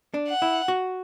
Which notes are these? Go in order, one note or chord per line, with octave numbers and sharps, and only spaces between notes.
D4
F#5
E4
F#4